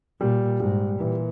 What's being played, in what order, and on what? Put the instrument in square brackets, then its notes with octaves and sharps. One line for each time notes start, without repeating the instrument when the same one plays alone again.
[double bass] A#2 [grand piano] G3
[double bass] G#2 [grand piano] G3
[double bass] A#2 [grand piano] E3